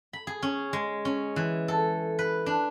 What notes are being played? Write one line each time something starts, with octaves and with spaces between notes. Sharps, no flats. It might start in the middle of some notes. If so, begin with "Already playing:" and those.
B5
G#4
C#4
G#3
C#4
E3
A4
B4
D4